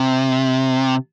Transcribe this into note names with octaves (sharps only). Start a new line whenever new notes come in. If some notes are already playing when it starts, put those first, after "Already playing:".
Already playing: C3